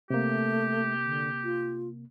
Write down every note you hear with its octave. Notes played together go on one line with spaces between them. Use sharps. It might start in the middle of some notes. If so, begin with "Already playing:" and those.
C3 A3 A#3 G4
D3
F4